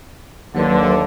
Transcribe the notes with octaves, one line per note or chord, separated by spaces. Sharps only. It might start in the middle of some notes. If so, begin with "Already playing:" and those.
D#2 D3 F#3 B4 C6